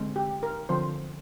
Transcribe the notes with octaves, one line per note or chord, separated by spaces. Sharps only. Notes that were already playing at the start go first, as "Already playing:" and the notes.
Already playing: D3 G#3 C4
G4
A#4
D3 F3 C4 C5